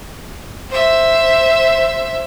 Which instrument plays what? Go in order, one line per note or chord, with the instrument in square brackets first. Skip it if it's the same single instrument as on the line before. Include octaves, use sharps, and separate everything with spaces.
[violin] C5 E5